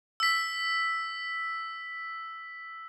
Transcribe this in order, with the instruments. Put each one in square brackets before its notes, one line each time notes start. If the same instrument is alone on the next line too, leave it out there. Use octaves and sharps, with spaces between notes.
[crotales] E6 B6